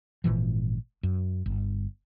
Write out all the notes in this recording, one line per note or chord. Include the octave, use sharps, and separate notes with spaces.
G#1 A#2 E3 F3
F#2
G1